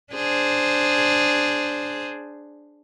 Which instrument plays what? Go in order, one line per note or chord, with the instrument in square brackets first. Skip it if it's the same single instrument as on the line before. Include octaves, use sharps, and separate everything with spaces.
[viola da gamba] D4 G#4 C5